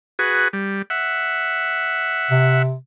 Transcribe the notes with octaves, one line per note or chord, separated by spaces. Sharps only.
F#4 G#4 B4
G3
E5 F#5
C3